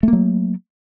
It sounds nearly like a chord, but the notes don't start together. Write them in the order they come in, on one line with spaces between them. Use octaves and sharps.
A3 A#3 F#3